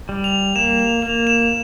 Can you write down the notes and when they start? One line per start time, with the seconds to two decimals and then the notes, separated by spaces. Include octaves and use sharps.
0.09 G3
0.24 F7
0.56 A#3 E7
0.79 F7
1.02 A#3 F7
1.27 E7